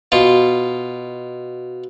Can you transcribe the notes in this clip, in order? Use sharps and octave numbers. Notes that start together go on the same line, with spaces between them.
B2 F4